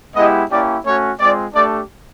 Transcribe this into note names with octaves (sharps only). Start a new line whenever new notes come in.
G#3 B3 E4 G4 D#5
A#3 C#4 E4 G4 D5
A3 C#4 F#4 C#5
G#3 C4 F4 D5
A3 D4 G4 D5